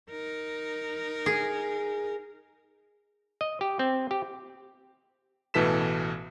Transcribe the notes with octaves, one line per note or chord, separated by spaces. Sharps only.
D#4 A#4
G#4
D#5
G4
C4
G4
A1 B2 E3 A4 B6 E7